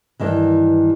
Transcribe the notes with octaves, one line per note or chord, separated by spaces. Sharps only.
G2 D#3 E3